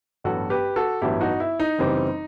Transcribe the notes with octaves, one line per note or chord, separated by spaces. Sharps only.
A1 G2 F#3 B3 F#4 A4
G4 B4
F#4 A4
A1 G2 F#3 B3 E4 G4
D#4 F#4
E4
D#4
F#1 F#2 E3 G3 C4